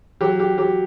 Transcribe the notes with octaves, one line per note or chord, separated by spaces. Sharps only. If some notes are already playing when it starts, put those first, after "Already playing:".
F#3 G4
G4
F#3 G4